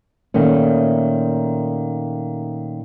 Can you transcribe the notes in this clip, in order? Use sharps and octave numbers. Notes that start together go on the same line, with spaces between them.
A#2 D#3 A3 C#4